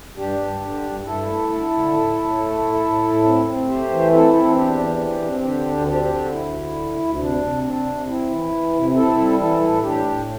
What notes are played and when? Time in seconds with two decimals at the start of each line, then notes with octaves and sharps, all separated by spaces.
0.17 G2 D4 G4
0.39 G2
0.61 D3
0.82 G2
1.05 G2 E4 A4
1.27 A3
1.49 D3
1.70 D3
1.92 A2
2.15 A2
2.37 A3
2.58 A2
2.80 A2
3.03 A2
3.24 C4
3.46 C4
3.68 A3 G4 C5
3.90 E3
4.12 C4 E4 A4
4.34 C4
4.56 E2 D4 G4
4.78 E3
5.00 C4
5.22 C4
5.44 D3 D4 G4
5.66 D2
5.87 C4 D4 G4
6.10 D3
6.31 D2 E4
6.53 D3
6.76 D2
6.97 D2
7.15 E4
7.19 C3 D4
7.41 C3
7.63 C4 D4
7.85 C3
8.07 C4 E4
8.30 E3
8.52 E3
8.73 C3
8.95 C4 E4 A4
9.18 G3
9.39 E3 E4 A4
9.61 A2
9.82 A2 D4 G4
10.05 A2